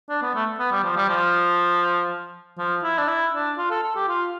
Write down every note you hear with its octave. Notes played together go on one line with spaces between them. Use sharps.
D4
B3
A3
B3
G3
F3
G3
F3
F3
E4
D4
E4
D4
F4
A4
A4
G4
F4